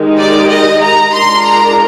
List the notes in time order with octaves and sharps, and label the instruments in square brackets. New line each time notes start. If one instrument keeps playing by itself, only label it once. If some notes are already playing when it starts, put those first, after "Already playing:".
Already playing: [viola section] D#3 G#3 D#4 G4
[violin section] D5
D#5
A#5
[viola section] G#3 D4 F4 A#4 [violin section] C6
[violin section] A#5